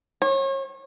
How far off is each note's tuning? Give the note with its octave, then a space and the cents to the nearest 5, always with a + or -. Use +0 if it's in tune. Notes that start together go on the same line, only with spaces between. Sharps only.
C#5 -35